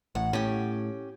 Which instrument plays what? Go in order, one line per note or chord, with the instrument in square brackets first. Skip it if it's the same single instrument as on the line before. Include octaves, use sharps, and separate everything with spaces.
[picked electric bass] A1 A2 [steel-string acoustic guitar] F#5
[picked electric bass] A2 [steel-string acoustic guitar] C#4 G4